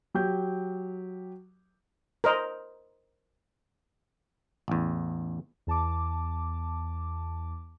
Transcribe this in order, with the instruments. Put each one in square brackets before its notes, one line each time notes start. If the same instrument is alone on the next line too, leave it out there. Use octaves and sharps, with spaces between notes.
[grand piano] F#3 G4 G6
[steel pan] A#4 C5 D#5
[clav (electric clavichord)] A1 E2
[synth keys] E2 A5 D6